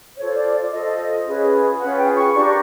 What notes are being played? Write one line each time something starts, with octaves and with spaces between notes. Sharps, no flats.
F4 A4 C5 C#5
D5
D5
F4 A4 C5 D#5
C#4 F4 G#4 B4
C#4 F4 G#4 B4 F#5
G5
C#6
D4 G4 A#4 C#6